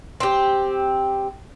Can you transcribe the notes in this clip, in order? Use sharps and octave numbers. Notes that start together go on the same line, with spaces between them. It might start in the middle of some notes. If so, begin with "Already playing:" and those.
C4 G4